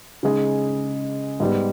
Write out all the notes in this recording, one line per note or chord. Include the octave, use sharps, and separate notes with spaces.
C#3 G#3 D#4 G#4
G#2 G3 B3